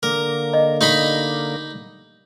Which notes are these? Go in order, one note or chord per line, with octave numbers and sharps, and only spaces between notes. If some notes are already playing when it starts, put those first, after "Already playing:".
D3 A#3 A#4
D#5
D#4 G4 D#5 B5